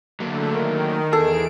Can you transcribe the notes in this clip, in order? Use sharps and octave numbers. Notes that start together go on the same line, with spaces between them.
D3 F#3 A3 A#3
D#3 A#4
E2 G#4 A4 D7